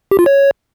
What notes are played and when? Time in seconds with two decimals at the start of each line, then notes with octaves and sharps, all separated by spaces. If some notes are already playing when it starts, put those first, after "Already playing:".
0.11 G4
0.19 F4
0.26 C#5